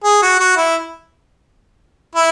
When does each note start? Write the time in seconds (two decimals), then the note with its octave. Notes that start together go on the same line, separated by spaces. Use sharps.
0.04 G#4
0.23 F#4
0.39 F#4
0.57 E4
2.15 E4